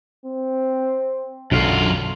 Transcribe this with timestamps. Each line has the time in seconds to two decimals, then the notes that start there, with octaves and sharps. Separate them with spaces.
0.25 C4
1.51 B1 F#2 D3 F4